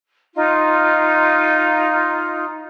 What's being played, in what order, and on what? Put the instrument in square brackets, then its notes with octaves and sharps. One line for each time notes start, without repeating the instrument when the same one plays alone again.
[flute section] D#4 F4